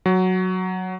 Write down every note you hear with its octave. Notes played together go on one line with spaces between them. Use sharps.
F#3